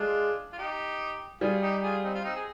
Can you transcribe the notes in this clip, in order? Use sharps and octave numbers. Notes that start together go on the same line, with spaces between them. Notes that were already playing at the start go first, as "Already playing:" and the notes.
Already playing: G#3 D4 F4
F4
D#4 G4
G3 F4 G#4
D#4 G4
F4 G#4
C4 D#4
F4
C4 D#4
G#4